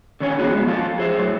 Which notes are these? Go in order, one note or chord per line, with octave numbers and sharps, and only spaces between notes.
D3 D#3 C#4 C#5 D#5 G#5
E3 F3 G3 B3 F#4 G#4
G#3 B3
F3 F4 G4 A4
G#4 C5 E5
F#2 A2 F#3